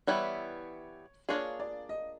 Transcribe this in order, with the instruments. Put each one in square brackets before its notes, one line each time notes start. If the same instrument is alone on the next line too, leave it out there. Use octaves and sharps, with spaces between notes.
[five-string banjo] E3 G3 B3 E4 [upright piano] C#5
[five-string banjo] A#3 D4 F4 G#4 [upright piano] C#5
[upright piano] D5
D#5